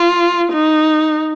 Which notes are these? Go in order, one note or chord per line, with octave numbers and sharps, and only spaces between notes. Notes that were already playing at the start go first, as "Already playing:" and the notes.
Already playing: F4
D#4